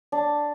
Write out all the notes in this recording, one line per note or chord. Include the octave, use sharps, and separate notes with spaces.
D4